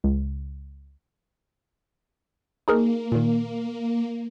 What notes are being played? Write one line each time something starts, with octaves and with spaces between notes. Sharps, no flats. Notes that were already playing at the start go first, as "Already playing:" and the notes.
C#2
A#3 D#4 G#4 A#4
A#2 D#3